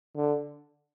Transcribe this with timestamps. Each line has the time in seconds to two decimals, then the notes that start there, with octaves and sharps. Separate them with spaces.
0.16 D3